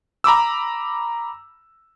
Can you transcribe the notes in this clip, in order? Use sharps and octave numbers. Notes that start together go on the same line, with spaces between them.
A#5 B5 D6 E6